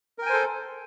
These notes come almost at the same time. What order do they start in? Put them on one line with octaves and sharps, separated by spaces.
A#4 G5 G#5 C5 A4